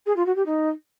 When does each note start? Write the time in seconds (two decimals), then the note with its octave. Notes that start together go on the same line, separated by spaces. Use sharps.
0.06 G#4
0.16 F4
0.26 F#4
0.35 G4
0.45 D#4